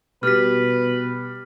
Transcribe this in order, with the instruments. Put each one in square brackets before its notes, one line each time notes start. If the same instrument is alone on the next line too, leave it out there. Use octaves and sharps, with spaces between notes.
[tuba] B2 [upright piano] G3 [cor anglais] B4 [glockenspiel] F6 B6